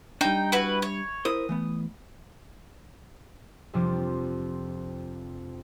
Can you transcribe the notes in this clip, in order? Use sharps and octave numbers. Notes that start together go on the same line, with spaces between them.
G3 D4 D#4 G5
E4 F#4 B4
C#5
E4 A#4 C5 D#6
E3 A3 B3
F2 C3 F3 D4